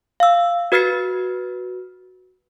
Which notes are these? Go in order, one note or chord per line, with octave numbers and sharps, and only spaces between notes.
F5 E6
F#4 B4 F6 A6 C7